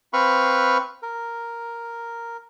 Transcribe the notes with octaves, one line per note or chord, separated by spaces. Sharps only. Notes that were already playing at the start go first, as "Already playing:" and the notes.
C4 B4 F5 B5 C#6
A#4